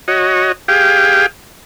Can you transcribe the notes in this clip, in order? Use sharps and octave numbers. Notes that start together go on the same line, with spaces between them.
F#4 C#5 D#5
G4 G#4 F5 G5